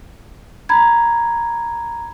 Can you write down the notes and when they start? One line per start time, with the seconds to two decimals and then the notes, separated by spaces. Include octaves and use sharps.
0.69 A#5 B5 G#6